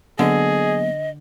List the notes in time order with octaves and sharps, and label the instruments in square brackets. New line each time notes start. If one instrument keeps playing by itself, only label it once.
[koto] D3 [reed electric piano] F#3 A#3 B3 [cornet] G#4 [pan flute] D#5